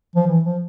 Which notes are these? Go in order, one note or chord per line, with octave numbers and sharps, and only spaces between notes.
F3
E3
F3